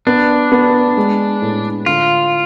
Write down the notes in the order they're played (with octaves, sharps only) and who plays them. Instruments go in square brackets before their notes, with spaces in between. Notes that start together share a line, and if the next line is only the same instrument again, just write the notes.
[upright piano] B3 [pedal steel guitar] D4
[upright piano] B3
G#3
A2
[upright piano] D3 [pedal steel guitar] F4